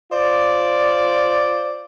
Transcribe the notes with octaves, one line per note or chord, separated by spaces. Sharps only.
F4 C5 D5